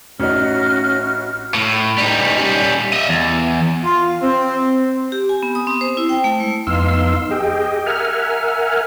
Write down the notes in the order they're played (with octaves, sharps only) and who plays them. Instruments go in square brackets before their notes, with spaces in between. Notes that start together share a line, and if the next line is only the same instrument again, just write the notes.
[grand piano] A1 D#4 [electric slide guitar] C#4 [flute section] F#4 F6
[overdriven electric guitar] A2
G3 D#4
G3 C#4
D#5 E5
E2
[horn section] F4
C4
[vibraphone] G4
G#5
B3
D#6
C4
C5
E4
G5
A3
G#3
[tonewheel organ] F2 B3 D#4 F5 C6 E6
G4 G#4 D#5 G5
A#4 E5 F#5 G#5 F6